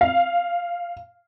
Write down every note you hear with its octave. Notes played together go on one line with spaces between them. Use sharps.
F5